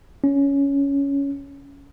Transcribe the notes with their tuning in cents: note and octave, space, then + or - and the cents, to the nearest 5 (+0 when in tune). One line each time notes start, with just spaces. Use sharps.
C#4 +10